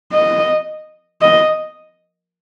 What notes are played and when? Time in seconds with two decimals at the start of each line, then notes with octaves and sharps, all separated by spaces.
0.13 D#5
1.22 D#5